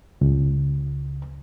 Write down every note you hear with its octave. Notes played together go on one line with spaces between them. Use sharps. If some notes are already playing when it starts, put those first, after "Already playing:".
C#2